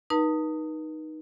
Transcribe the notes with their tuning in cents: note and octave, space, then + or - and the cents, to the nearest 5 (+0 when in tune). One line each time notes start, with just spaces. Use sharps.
D#4 +0 B4 -40 A5 +45